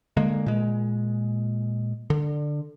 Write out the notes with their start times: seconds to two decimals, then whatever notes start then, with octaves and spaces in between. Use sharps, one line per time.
0.17 D3 G#3 A#3
0.46 A#2 G#3
2.10 D3